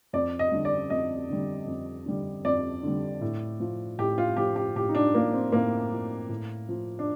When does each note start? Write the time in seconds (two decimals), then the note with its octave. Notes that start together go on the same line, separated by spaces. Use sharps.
0.13 F2 D5
0.39 D#5
0.52 D3 G3
0.65 D5
0.90 F2 D#5
1.30 D3 G3
1.67 F2
2.06 D3 G3
2.45 F2 D5
2.83 D3 G3
3.21 A2
3.60 F3
3.98 A2 G4
4.18 F4
4.37 F3 G4
4.56 G4
4.76 A2 G4
4.89 D#4
4.95 D4
5.15 F3 A#3
5.34 C4
5.52 A2 A#3
5.92 F3
6.29 A2
6.69 F3
6.99 D4